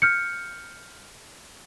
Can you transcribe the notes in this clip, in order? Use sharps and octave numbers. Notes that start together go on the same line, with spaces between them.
F6 G6 C#7